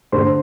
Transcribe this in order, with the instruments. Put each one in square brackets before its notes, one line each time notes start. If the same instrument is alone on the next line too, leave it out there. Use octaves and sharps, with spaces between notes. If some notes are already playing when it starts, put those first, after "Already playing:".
[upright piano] D3 C5 C6